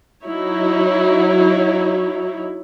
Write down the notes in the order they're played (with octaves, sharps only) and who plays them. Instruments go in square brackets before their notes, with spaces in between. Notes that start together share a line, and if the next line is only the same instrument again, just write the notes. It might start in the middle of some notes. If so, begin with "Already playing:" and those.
[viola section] F#3 D#4 E4 C#5